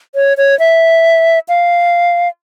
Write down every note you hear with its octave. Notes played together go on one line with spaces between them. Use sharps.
C#5
C#5
E5
F5